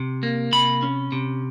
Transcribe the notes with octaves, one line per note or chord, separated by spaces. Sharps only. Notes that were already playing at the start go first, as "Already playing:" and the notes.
Already playing: C3
A#3
C3 B5
C#4
C3